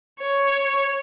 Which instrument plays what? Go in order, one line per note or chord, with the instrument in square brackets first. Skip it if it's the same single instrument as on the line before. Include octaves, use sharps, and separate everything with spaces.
[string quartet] C#5